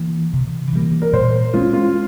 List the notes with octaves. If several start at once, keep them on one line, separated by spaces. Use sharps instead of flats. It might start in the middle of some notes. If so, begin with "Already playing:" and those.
Already playing: E3 A#3
C3
E3 G3 A#3
A#4
A#2 C5
G#3 C#4 F4
F4